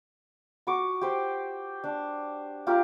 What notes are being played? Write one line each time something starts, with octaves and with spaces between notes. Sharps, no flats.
F#4 C#6 D6
G4 C5
D4
F4 G4 A#4